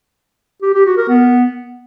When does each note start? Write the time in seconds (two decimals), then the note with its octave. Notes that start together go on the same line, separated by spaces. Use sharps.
0.62 G4
0.74 G4
0.86 F#4
0.97 A#4
1.09 B3